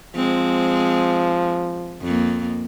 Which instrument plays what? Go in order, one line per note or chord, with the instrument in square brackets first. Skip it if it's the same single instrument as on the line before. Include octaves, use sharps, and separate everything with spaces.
[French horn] F3 [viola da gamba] G#3 C4
[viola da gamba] F2 A#3